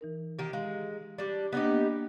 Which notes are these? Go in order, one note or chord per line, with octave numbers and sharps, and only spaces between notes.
E3 D#4 A#4
D#3 G4
G#3 G4 F5
G3 D4
A#3 B3 D4 D#4 G4 D#5